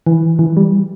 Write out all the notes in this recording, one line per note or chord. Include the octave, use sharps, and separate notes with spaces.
E3
E3
G3